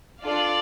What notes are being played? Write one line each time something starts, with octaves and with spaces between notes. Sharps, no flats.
D4 F4 A4 D5 F5